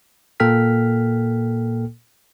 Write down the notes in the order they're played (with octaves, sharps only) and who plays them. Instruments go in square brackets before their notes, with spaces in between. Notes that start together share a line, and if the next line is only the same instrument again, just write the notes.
[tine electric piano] A#2 A#3 A4 G5 F6 B6